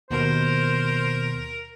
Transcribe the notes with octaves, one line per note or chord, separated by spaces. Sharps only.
D#2 B2 A#4 C5